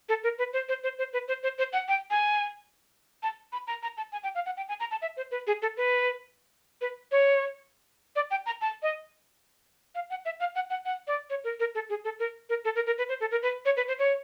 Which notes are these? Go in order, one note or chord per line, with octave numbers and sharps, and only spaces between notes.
A4
A#4
B4
C5
C5
C5
C5
B4
C5
C5
C5
F#5
G5
G#5
A5
B5
A#5
A#5
A5
G#5
G5
F5
F#5
G5
G#5
A#5
A5
E5
C5
B4
G#4
A4
B4
B4
C#5
D5
G5
A#5
A5
D#5
F5
F#5
E5
F5
F#5
F#5
F#5
D5
C#5
A#4
A#4
A4
G#4
A4
A#4
A#4
A4
A#4
A#4
B4
C5
A4
A#4
B4
C#5
B4
C5
C#5